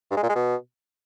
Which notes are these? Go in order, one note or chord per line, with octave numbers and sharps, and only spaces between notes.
G2
G#3
A#2
G#3
B2